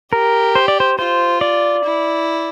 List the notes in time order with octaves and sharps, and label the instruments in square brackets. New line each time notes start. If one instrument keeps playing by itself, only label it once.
[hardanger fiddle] G4 [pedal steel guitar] A#4
[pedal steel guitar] C5
D5
C5
[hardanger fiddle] F4 [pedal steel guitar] C5
[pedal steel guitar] D5
[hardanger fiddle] E4